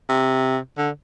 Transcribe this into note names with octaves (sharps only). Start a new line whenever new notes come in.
C3
D3